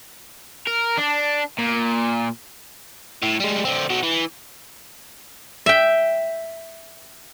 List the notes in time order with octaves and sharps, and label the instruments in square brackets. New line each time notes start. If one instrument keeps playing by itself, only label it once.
[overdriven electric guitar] A#4
D4
A#2
A2
G3 G#3
D3 C4
B2 F#3
E3
[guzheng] E5 G5